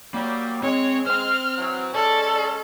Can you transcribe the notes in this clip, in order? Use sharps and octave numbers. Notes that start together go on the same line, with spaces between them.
F#3 G3 A#3
G#3 C4 C#5
C5 G5 F6
E3 F#3
G#3 C#4 A4 D5